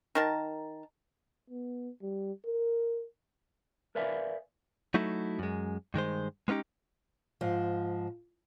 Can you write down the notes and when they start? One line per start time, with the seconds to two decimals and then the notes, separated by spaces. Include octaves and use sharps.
0.15 D#3 A#4 A5
1.50 B3
2.01 G3
2.46 A#4
3.95 A#4 B4 D5 E5 F5 G#5
4.94 F#3 A3 D#4 E4 F#4 A4
5.39 F#2 G#3
5.94 G2 D#3 G#3 C5
6.48 G#3 B3 C#4 D#4 G4
7.41 G#2 F3